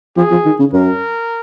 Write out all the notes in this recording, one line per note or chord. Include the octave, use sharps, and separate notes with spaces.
F3 G#4
F3
D#3
C#3
F#2 A#4